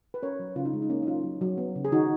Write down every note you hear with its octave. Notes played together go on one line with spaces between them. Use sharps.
B4
C#4 A#4 C#5
F#3
C#3 C#4 F4
D#4
G#3 C#4
D#4
A#3 C#4
D#4
F#3 C#4 F4
F#3
F#3
B3
C#3
G#4
D#3 D#4 F#4